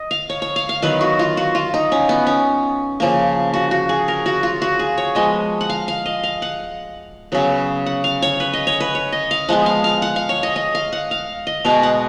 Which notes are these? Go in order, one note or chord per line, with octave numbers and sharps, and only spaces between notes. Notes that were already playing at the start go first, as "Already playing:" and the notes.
Already playing: D#5
F5
C#5
C#5
F5
F5
D#3 F#3 B3 B4
F#4
F4
F#4
F4
D#4
C#4
B3
C#4
C#3 F3 A#3
F#4
F#4
G#4
A#4
F#4
F4
F#4
G#4
C#5
F3 G#3 B3 D#5
F#5
F5
F5
D#5
F5
F#5
C#3 F#3 B3
F#5
F5
C#5
B4
D#5
C#5
B4
C#5
D#5
F5
F3 G#3 B3 F#5
F5
F5
F#5
F5
C#5
D#5
D#5
F5
F#5
F5
D#5
B2 G#3 B3 F5
F#5